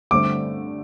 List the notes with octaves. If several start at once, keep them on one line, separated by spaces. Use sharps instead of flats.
G2 D3 A3 C4 D6